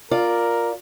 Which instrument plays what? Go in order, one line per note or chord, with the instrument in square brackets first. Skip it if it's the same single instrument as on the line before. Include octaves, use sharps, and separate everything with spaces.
[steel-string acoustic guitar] F4 D5 [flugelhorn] A#4